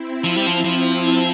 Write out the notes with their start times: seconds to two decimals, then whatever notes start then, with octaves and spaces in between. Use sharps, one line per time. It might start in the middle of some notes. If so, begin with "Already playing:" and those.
Already playing: C4 E4
0.24 F3
0.36 G3
0.47 F3
0.65 F3